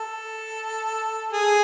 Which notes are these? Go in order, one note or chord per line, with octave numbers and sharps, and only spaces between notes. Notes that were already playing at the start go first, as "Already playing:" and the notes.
Already playing: A4
G#4